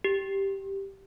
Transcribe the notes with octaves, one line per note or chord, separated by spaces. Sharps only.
G4